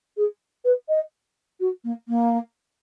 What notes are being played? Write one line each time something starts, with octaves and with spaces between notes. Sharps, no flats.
G#4
B4
D#5
F#4
A#3
A#3